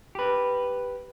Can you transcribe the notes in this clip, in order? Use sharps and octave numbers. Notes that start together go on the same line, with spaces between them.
G4 B4